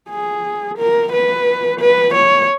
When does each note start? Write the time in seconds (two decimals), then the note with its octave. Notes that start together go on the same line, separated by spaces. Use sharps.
0.10 G#4
0.78 A#4
1.13 B4
1.80 B4
2.15 C#5